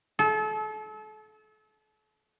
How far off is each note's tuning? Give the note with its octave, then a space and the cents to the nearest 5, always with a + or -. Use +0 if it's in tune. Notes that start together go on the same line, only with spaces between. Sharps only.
A4 -35